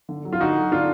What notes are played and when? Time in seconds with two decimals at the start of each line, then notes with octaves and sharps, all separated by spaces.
0.09 D3
0.25 F#3
0.33 F4
0.40 D3 D#4 F#4
0.56 F#3
0.71 D3 D4 F4